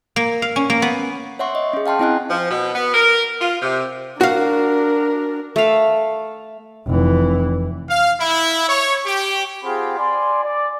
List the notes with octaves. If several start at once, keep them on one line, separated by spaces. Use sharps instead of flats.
A#3
F5
C#4
A#3
B3
C#5 E5 F#5 C6 C#6
D#5
C#4 G#4
F5 G5 A5 C6 F6
C4 E4 D#5 F#5 G#5 F#6
F3
B2
B3
A#4
F4
C3
D4 F#4 A#4 F5
A3 F5
F1 E3
F5
E4
C#5
G4
C4 F4 G4 G#4 F#5 B5
D5 G#5 C6
D5